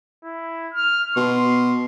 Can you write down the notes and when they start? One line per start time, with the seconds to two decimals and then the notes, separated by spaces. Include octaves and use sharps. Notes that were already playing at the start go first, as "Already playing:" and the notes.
0.24 E4
0.73 F6
1.16 B2 C6